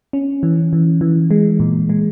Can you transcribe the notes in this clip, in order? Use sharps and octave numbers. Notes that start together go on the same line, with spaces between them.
C#4
E3
E3
E3
G#3
A#2
G#3